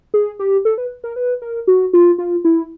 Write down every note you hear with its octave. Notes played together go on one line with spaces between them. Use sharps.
G#4
G4
A4
B4
A#4
B4
A#4
F#4
F4
F4
E4